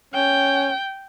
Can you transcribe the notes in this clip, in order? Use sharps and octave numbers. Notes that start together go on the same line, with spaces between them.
C#4 G5